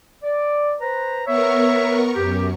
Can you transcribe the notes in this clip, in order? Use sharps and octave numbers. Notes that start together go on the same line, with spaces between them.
D5
B4 C5 A#5
B3 A#4 C#5 E5 C#6
F#2 G4